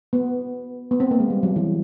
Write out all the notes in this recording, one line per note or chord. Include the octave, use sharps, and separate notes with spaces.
B3
B3
C4
A#3
G#3
G3
F#3
E3